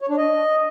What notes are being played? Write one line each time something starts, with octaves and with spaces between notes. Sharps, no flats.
C#5
D4
D#5